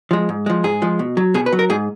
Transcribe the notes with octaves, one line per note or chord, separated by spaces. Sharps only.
F3 G#3
G#2
F3 G#3
G#2 G#4
F3 G#3
B2
F#3
B2 G#4
B4
F#3
A#4
G#2 G#4